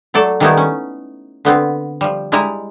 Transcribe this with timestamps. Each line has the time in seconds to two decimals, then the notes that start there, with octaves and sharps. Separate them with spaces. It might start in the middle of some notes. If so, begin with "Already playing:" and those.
0.14 F#3 A3 A4 D5
0.40 D#3 G3 A3 B3 D#4 E4
0.57 C#4
1.45 D3 B3 C4
2.01 F3 G3
2.32 G3 G#3 E4 D#5 A#5